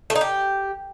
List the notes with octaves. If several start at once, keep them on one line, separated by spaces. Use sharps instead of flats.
A3
D#4
G4